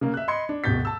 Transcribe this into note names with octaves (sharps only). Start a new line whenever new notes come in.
C#3 A#3
E5 F#6
D#5 B5 C6 G#6 C#7
D4
D1 B2 G6 A6 B6
A5 E6